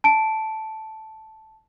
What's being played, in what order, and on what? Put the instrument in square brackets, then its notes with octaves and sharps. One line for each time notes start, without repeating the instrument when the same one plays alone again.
[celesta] A5 D7